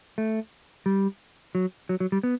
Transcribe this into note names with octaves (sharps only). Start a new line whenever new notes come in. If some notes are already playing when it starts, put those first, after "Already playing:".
A3
G3
F#3
F#3
F#3
G3
B3